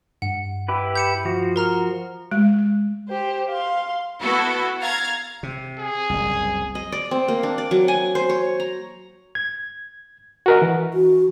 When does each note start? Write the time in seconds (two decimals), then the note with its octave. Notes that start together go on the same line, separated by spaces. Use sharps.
0.22 G2 F#5
0.68 E4 G4 B4
0.96 G6 C#7 E7
1.25 F3 F#4
1.56 A#4 A#5 F6
2.31 G#3
3.09 G4 C5
3.49 F5 C6
4.20 B3 E4 F#4 A4
4.81 F5 A#5 G#6 A6
5.43 C3
5.79 G#4
6.10 F#1 C2
6.75 D#5
6.92 D5
7.11 C4
7.28 A#3
7.43 D4
7.58 D5
7.71 F#3
7.88 G#5
8.15 C5
8.29 C#5
8.60 A#5
9.35 G#6
10.46 F#4 A#4 D#5
10.62 E3
10.94 F#4